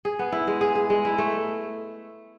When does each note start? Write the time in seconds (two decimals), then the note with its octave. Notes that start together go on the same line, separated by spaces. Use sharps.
0.05 G#4
0.19 B3
0.32 E4
0.47 G#3
0.61 G#4
0.75 G#4
0.90 G#3
1.05 E4
1.18 A3